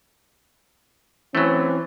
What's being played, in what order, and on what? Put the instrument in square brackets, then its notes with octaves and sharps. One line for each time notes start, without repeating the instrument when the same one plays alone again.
[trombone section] E3 C4 C#4 [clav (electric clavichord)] F#3 A3